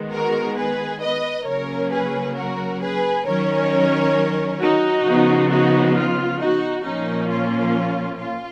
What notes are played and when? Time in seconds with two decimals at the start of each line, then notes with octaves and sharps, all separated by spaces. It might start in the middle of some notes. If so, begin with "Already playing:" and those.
Already playing: D#3 G#3 B3
0.12 F#4 A#4
0.57 G#4 B4
1.01 B4 D#5
1.46 C#3 F#3 A#3 C#4 A#4 C#5
1.91 G#4 B4
2.36 F#4 A#4
2.81 G#4 B4
3.26 D#3 F#3 C#4 A#4 C#5
4.60 D#4 F#4
5.05 C#3 F3 B3
5.49 D#4 F#4
5.95 F4
6.39 D#4 F#4
6.84 A#2 F3 A#3 C#4 D#4
7.29 F4
8.18 F4